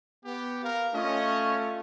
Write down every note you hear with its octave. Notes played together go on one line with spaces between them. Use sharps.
B3 G4
A#4 F5
A3 C#4 F4 D#5